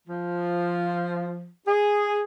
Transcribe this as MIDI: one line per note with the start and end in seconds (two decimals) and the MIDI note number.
0.08 1.49 53
1.68 2.22 68